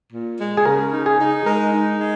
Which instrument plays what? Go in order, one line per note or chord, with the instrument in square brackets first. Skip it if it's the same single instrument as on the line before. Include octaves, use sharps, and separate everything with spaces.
[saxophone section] A#2
G#3
[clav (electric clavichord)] G#4
[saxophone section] C#3 [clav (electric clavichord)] A#4
[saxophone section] D#4
[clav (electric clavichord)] G#4
[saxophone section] D#4
[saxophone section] G#3 [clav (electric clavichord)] A#4
[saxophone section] D#4
G#3